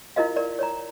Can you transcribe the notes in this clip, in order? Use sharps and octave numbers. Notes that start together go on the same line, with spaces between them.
E4 F4 A#4 D#5 F5
A#4 D5
C#5 D5 A#5